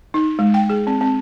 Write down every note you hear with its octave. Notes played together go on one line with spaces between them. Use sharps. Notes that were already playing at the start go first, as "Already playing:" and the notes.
D#4
G#3
G5
G#4
C4
C4